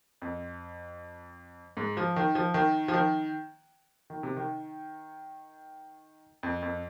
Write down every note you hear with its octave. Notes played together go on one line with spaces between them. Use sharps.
F2
G#2
F3
D#3
F3
D#3
F3
D#3
D#3
C3
D#3
F2
F2